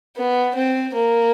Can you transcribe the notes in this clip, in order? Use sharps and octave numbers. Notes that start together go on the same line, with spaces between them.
B3
C4
A#3